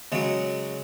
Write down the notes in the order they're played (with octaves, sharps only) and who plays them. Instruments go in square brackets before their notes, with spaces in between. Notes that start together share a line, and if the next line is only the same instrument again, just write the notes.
[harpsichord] C#3 F#3 G#3